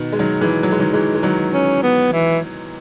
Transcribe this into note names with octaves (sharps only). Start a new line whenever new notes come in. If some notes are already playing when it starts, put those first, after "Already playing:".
Already playing: B2 D#3
G#3
D#3 F#3
E3 G#3
F#3
G#3
D#3 F#3
E3 G#3
G#3
D#3 F#3
C#4
B3
E3